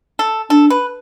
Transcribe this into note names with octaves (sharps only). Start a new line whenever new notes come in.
A4
D4 A4
B4